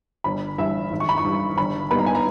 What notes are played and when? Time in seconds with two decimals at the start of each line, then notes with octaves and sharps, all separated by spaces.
0.24 G1 B5
0.58 G2 E3 E5
0.91 G#1
1.00 C#6
1.09 B5
1.18 C#6
1.25 G2 E3
1.57 G1 B5
1.91 G2 G3 B3 D#4 B5
1.99 A#5
2.06 G#5
2.15 A#5